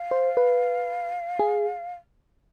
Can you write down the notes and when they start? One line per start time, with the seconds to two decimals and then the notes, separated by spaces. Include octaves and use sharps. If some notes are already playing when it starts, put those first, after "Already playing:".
Already playing: F5
0.11 C5
0.37 B4
1.39 G#4